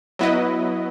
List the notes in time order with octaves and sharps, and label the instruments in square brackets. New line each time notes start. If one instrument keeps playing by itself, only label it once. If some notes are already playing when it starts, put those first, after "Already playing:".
[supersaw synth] F#3 B3 E4 B4 D#5